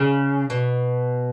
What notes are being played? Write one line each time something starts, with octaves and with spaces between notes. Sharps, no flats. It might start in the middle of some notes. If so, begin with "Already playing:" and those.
Already playing: C#3
B2